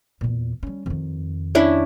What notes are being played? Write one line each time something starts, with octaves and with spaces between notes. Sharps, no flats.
E2 A#2
G3 C#4
F2 D#3
C#4 D4 E4